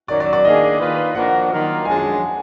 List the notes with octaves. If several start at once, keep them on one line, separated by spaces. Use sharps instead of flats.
F#2 D#3 F#3 D5
D5
D5
D#3 A#3 D4 G#4 D#5
D#3 A#3 F4 B4
F3 A#3 D4 F#4 A#4 F#5
D#3 F#3 A#3 F4 A#4
F#2 F3 G#3 D4 G#5